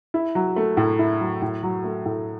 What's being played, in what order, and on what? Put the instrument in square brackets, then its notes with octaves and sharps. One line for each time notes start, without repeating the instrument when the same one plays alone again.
[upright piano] E4
F#3
A3
A2
E4
F#3
A2
F#3
A3
A2